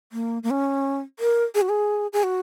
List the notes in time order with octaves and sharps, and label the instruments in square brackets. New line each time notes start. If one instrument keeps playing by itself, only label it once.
[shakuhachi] A#3
A#3
C#4
A#4
G#4
F#4
G#4
G#4
F#4